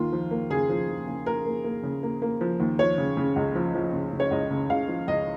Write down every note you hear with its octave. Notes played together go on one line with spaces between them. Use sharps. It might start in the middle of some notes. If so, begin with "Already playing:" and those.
Already playing: D#2 A#3 F4
F3
A#3
C#3 G#4
F3
F3
C#3
A#3 A#4
A#3
A#3
C#3
A#3
A#3
F3
D#2
F3 C#5
C#3
C#3
C#2
F3
F3
C#3
C#3
C#5
C#2 D#5
C#3
C#2 F5
F3
C#2 D#5